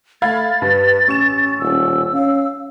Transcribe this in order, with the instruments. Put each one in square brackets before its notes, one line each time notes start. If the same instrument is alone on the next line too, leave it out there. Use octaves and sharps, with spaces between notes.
[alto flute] A3 [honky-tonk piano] F5 B5 G#6 [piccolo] A6
[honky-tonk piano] G2 [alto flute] B4
[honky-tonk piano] A1 C#6 E7 [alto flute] C#4
[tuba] D#1 [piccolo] E6
[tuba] C#4 [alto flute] F5